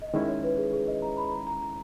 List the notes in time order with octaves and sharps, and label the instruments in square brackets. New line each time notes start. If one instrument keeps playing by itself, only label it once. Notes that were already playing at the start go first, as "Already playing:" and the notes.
[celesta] D#5
[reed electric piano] D#3 G#3 C#4 E4 [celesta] C#5
[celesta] C#5
B4
G#4
G#4
D#5
A#5
B5
A#5
A#5
A#5